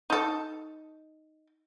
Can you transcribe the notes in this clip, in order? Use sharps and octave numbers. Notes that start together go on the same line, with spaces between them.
D#4 A4